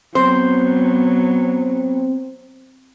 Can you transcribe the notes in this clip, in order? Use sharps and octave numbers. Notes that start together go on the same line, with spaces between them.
F#3 B3 C4 C5